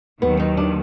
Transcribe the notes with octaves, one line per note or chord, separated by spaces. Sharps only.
D#2 D#3 F#3 B3
D#4
D4